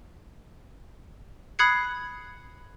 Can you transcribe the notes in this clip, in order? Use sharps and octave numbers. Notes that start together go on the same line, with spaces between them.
B5 D#6 F#6 G#6 C7 C#7